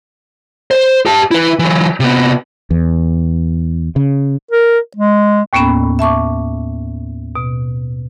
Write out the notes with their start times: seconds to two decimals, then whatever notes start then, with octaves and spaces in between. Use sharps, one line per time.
0.71 C5
1.06 G4 A5
1.31 E4 B4
1.59 E3 F#3
2.00 C3 B3
2.71 E2
3.96 C#3
4.51 A#4
4.97 G#3
5.53 D#2 A2 A#3 B3 C#4 B5
5.99 E5 A5 C#6 D6
7.36 B2